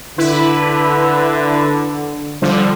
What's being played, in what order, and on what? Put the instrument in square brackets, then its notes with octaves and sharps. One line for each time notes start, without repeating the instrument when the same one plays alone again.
[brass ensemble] D3 [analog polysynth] E4 B4
[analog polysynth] D3 F3 G3